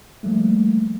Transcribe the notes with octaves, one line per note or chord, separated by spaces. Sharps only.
F3 G3 A3 A#3